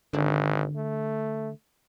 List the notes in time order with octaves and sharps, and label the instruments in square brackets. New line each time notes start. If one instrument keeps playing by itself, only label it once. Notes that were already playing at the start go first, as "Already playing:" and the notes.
[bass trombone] G#1 [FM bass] D3
[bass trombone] A3